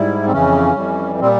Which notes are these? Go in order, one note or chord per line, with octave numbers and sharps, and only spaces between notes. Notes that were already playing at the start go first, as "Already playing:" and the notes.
Already playing: G#2 G3 E4
C4
F2 C#3 E3 C#4
F2 E3 G3
A#2 G3 C4